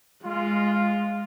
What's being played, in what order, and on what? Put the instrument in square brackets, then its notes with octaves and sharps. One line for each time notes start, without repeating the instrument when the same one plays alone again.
[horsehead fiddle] G#3 [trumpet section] F4